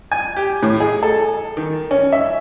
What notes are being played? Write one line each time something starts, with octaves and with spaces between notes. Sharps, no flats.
G#5
G4
A2
G#4
A4
D#3
C#4
E5